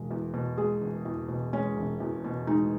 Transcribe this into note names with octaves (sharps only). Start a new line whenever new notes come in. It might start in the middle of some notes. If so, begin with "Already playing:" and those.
Already playing: E1 G#3
E2
B2
G#3 G#4
E1
E2
B2
G#3 C#4
E1
E2
B2
G#3 D#4